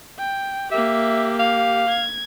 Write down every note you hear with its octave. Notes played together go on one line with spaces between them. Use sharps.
G5
A#3 G4 E5
F5
G#6